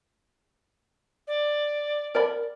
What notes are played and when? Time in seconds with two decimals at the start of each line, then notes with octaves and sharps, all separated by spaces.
1.27 D5
2.15 A#4 D5 B5